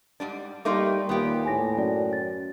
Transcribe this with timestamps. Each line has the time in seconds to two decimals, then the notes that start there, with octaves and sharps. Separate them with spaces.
0.20 G#2 G3 D4
0.65 G3 A3 A#3 D#4 C6 D6
1.09 D#2 A#2 B3 G4
1.45 A2 G#5 A#6
1.77 F#2 D5 G5
2.13 A6